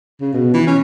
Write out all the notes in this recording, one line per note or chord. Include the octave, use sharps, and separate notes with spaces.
C#3
B2
E3
C#4